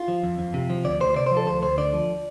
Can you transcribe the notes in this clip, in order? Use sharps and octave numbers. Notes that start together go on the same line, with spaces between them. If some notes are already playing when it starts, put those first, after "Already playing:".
Already playing: F4
F3
F2
F2
C3
F3
D2 D5
D2 C5
C3 D5
F3 C5
A4
D2 C5
D2 C5
D3 D5
F3